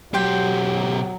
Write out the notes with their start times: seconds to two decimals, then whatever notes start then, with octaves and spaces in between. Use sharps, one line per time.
0.14 B1 F#3 G4 G5 C6